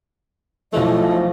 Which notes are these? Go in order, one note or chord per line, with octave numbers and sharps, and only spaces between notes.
B1 E3 F3 A3 D#5